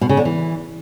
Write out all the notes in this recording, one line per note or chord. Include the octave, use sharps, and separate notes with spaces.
B2
C#3
D3
E3